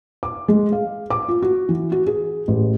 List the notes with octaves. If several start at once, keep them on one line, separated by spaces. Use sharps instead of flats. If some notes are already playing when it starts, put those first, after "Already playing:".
D6
G#3
F5
D6
F4
F#4
E3
F#4
G#4
A1